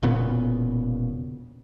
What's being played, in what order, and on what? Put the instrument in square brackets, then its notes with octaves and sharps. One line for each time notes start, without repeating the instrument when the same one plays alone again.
[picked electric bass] E1 A#2 C#3 B3